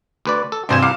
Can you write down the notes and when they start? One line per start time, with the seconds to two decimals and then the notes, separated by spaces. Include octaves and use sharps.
0.25 D2 B4 D5
0.52 A4
0.69 A1 G2 C3 C5 G#5 E7
0.83 C2 F5 D6 F6